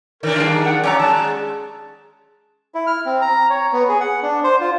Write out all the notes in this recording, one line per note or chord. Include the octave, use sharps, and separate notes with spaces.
D#3 D4 A#4
F3 G3 G#4
D#4
F#5
F#3 C#4 D5 G5 A#5
G#3 A5
E4
F6
C4
A#5
C#5
B3
G#4
F#5
D4
C5
F4